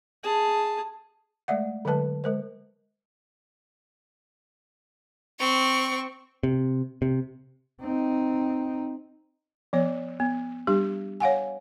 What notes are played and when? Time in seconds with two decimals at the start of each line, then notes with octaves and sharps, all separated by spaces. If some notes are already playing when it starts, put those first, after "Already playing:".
0.23 G#4 A5
1.48 G#3 A3 D5 E5 F#5
1.85 D3 F#3 G#3 B4 A5
2.24 G#3 A#4 C5
5.40 C4 C#6
6.43 C3
7.02 C3
7.81 C4 D#4
9.73 F3 B3 C#5
10.20 B3
10.67 G3 D4 G4
11.20 C#5 F5 F#5 G#5